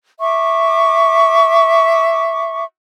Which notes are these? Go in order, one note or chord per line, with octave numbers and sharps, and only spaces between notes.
E5 C#6 D6